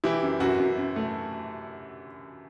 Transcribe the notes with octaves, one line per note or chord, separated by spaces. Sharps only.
E3 E4 G4
F#2
F#2 F#4
F#2
F#2
A3